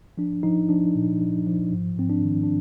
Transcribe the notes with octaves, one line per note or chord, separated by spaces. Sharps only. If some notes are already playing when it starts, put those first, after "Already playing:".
F3 D4
F3 D#4
F3 D4
A#2
F3
F3
G#2
G#2 C4
D4
D#3
D4